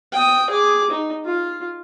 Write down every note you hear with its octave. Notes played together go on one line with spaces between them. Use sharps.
G5 D#6
G#4 D6
D#4
F4